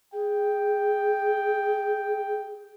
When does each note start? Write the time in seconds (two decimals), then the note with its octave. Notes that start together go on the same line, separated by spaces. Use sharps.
0.13 G#4 G5